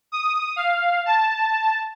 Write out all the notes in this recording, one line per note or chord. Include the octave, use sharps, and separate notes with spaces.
D#6
F5
A5